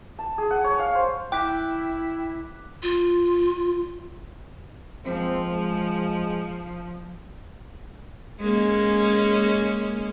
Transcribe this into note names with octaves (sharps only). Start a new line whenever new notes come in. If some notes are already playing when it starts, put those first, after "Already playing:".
A5
G#4
F#5
C#5
F5
C5
E4 G5 D6 F#6 B6
F4
F3 G#3 A#3 C4
G#3
G#3 A#3 C#4